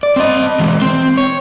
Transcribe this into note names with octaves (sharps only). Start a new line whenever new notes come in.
D5
C4 D#5
E3 G#3
C4
C#5